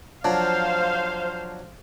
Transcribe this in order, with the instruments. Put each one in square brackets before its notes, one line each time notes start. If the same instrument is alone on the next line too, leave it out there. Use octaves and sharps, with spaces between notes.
[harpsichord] F3 F#3 D4 [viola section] C5 F5